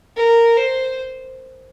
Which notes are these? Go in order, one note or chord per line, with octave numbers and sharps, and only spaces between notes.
A#4
C5